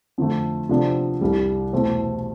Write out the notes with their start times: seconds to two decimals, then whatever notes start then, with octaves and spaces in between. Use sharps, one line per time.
0.18 F2 D3 A3
0.69 C3 F3 B3 D4 A4
1.21 C2 C3 G3
1.73 E2 B2 A3 C4